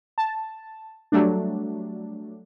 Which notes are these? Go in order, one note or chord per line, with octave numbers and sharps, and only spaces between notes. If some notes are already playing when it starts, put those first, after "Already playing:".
A5
F#3 G3 A3 D4